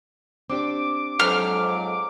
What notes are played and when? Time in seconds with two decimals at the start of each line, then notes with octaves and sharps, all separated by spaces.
0.50 C4 D4 G4 D6
1.20 F2 G#2 F#3 F6